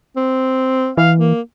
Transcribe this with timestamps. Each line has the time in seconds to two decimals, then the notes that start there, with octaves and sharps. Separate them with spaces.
0.16 C4
0.97 E3 F5
1.19 A#3